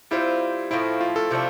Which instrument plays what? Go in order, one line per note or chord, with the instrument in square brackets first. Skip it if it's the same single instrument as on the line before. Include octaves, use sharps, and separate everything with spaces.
[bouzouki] G3 C4 F4 C5 [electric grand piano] E4
[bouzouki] A2 F3 C4 [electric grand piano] E4
[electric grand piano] F4
A4
[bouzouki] C3 F3 A3 D4